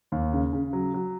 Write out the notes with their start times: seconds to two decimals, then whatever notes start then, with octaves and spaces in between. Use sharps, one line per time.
0.12 D#2
0.33 C#3
0.53 C#3
0.73 F#3
0.94 F#3